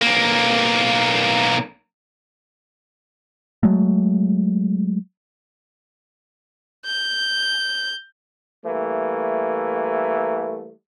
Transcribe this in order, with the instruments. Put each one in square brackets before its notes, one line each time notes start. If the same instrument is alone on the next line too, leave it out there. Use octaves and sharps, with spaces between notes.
[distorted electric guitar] B1 A#3
[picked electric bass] F#3 G#3 A3
[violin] G6
[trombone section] E3 G3 A3 A#3